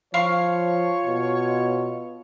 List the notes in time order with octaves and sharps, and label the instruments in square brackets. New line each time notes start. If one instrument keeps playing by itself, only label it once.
[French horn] F3 [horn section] F4 C#5 [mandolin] F5 C#6
[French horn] B2